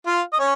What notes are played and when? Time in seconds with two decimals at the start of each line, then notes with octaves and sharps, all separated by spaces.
0.06 F4 F5
0.33 D#5
0.39 C#4 C#5